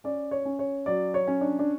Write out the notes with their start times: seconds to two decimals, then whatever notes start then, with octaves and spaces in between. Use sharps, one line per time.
0.04 C#4 D5
0.31 C#5
0.45 C#4
0.59 C#5
0.86 F#3 D5
1.14 C#5
1.28 C#4
1.41 D4
1.59 D4